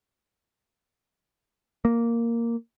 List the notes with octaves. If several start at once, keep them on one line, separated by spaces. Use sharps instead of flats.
A#3